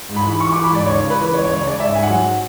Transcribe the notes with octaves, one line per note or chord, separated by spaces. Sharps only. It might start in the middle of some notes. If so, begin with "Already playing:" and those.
G#2
B5
E3
E3 C#6
D6
E3
B5
G#2 D5
C#2 C#5
C#3
B4
E3
C#2 C#5
C#5
C#2
C#5
C#3 D5
G#2 E5
G#2 G#5
F#5
F#3